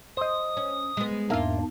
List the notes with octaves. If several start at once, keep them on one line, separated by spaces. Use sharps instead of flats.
C5 D#5 D#6
C#4
G#3 B3
E2 G#2 A#3 D4 F4 E5 F5